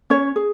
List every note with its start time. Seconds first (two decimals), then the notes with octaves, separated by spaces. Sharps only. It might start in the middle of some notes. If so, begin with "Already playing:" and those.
0.10 C#4 C#5
0.36 G#4